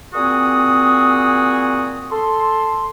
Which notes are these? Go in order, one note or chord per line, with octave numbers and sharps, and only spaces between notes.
A#2 C4 F#4 G#4 D#6
A4 C6